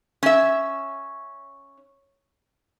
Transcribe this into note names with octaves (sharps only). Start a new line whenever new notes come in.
C#4 E5